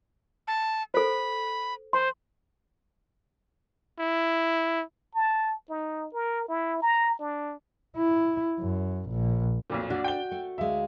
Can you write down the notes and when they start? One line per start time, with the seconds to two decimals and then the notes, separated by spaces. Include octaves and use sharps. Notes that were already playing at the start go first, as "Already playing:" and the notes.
0.48 A5
0.94 A4 C5 B5
1.93 C5 C6
3.99 E4
5.15 A5
5.69 D#4
6.13 A#4
6.48 E4
6.82 A#5
7.19 D4
7.96 E4
8.59 F#2
9.10 A#1
9.70 B1 F2 A#2
9.90 D4 F#4
10.04 G5 G7
10.31 A3
10.58 D2 G#3 E5 F5